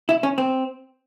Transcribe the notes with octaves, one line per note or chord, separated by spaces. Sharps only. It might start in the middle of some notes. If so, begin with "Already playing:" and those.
E4
C#4
C4